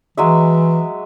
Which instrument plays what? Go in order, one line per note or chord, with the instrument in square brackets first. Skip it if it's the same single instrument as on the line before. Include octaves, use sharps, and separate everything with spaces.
[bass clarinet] E3 [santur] F#3 G#3 E5